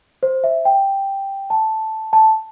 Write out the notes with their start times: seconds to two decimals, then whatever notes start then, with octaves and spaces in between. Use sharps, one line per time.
0.23 C5
0.44 E5
0.65 G5
1.50 A5
2.13 A5